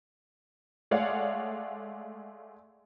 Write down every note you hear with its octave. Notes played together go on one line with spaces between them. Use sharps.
G#3 A3 C#5 D5 F5 F#5